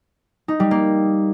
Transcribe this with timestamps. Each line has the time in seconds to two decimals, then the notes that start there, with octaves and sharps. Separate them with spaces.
0.48 D#4
0.60 G3
0.71 A#3